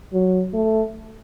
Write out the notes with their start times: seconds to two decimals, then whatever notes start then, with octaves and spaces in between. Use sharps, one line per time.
0.13 F#3
0.54 A3